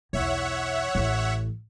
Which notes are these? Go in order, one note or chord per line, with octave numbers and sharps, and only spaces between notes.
B1 E2 C#5 E5 F#5
A1 E3